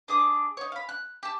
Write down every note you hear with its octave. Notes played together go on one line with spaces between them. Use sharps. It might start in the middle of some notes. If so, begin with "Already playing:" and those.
D4 G#4 D6 D#6
D#4 C#5
F5 B5
F#6
G4 A5